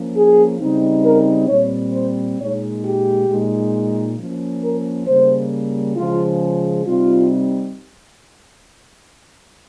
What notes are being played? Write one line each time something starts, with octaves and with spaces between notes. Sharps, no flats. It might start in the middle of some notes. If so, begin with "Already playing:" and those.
Already playing: F3 A#3 C#4
G#4
C#3 G3 C4 D#4
A#4
A#2 G3 C4 C#5
C5
A#2 G#3 D#4 C#5
G4
A#2 G#3 D#4
F3 A#3 C#4
A#4
C#3 G3 A#3 C5
C#3 F3 G#3 F4
C3 G3 C4 D#4 F4